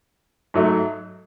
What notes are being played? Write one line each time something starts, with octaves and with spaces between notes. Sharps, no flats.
G#2 F#3 A3